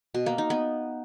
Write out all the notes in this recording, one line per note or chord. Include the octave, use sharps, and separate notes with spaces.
B2
A#3
D#4
B3